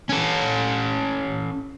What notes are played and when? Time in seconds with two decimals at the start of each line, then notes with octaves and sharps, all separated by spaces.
0.09 C#4 A4